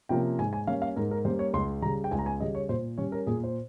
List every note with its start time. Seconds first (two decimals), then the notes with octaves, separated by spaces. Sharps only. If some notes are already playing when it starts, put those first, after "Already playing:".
0.09 C3 F3 A#3 C#4 G5
0.39 G#2 G#5
0.53 G#5
0.67 G3 A#3 C#4 F5
0.82 F5
0.96 G#2 A#4
1.11 A#4
1.25 G3 A#3 C#4 C5
1.39 C#5
1.53 C#2 C6
1.82 C#3 G3 A#5
2.04 G5
2.11 C#2 G#5
2.19 A#5
2.26 G#5
2.40 C#3 G3 D#5
2.55 C#5
2.69 A#2 C5
2.98 G3 C#4 C#5
3.12 A#4
3.27 A#2 G#4
3.44 C5